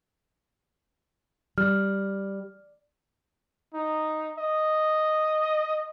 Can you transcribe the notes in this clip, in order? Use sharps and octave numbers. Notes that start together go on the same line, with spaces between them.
G3 F6
D#4
D#5